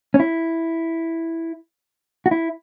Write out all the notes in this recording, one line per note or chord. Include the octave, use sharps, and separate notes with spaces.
C#4
E4
F#4
E4